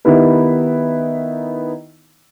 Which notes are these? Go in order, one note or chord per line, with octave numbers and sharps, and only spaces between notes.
D#3 B3 D#4 E4 G4 B4